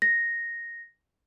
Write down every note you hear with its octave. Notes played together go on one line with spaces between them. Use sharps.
A#6